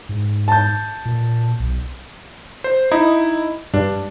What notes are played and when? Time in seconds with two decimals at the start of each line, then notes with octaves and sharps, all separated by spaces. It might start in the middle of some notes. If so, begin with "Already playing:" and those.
0.09 G#2
0.48 A5 G6
1.05 A#2
1.60 B1
2.64 C5
2.91 D#4 E4
3.74 G2 D4